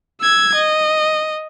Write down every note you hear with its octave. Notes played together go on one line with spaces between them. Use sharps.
E6 G#6
D#5